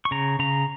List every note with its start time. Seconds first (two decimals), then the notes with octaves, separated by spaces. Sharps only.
0.05 C#6
0.11 C#3 A#5
0.39 C#3 A#5